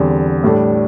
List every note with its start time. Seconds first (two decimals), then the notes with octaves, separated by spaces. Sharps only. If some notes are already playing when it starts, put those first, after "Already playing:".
Already playing: E2 D3 G3 C4
0.44 A2 G3 D4 A4